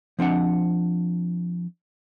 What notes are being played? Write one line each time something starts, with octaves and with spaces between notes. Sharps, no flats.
F3 C4 D4 F#5